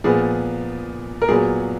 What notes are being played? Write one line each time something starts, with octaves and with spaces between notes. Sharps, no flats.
A#2 F3 B3 G#4
A#4
A#2 F#3 B3 G#4